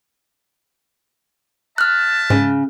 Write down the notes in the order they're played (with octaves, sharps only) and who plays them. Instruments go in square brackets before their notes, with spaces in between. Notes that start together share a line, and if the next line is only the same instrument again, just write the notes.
[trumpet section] E5 A5 [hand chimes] F6 F#6
[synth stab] G#2 [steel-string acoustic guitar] C#3